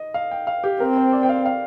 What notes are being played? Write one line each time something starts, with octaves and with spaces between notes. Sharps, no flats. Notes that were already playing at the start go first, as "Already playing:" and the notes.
Already playing: D#5
F5
G5
F5
G4
C4 A#4
C5
D5
G5
F5
F5